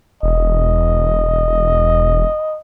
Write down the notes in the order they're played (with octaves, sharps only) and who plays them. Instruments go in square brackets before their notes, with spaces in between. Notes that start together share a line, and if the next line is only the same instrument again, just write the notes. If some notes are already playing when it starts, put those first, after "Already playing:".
[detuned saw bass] E1 [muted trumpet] D#5